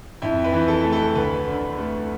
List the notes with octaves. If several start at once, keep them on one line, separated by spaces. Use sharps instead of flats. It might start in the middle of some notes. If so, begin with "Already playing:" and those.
F2 E4
B4
E3
A4
A3
A4
D2 B4
D3
A3